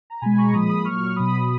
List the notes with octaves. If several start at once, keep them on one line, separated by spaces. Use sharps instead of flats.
A#5
B2 G#3 G#5 B5
A#5 C#6
A#2 F3 G#3 B5 D#6
B5 D#6
A#2 F#3 C#6 F6
B2 F#3 B5 D#6